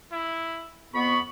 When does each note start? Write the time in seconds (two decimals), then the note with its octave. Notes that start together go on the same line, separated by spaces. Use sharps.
0.12 E4
0.94 F2 B3 B5 C#6